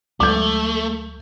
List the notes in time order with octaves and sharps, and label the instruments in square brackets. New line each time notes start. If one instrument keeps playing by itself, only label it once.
[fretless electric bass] D2 F#3 G#3 [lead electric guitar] A3 [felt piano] D6 G6